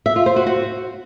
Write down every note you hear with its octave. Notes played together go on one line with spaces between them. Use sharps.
E5
F4
C5
F#4
F#4